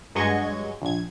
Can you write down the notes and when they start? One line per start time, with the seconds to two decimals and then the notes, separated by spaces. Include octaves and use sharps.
0.15 G2 F#3 G#3 D#5 C#6 G#6
0.82 A#1 G#6